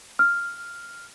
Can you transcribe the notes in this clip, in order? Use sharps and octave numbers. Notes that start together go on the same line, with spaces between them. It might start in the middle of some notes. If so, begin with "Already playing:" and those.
F6